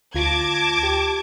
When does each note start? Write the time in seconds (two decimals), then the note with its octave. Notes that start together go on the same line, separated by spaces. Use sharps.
0.15 D2 F4 A5 D6 G#6 A#6
0.83 G4